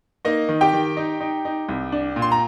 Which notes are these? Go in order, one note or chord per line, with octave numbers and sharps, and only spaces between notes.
A#3 D#4 D#5
D#3
G4 G5
D#3
D#4
D#4
D#4
C2
D4
A#2
C6
A#5